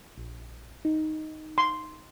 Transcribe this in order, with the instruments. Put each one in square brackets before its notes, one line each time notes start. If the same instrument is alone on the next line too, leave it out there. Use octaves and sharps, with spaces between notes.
[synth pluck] A#1
D#4
[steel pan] C6